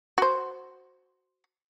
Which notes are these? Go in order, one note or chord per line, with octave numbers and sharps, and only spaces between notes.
F#4 C5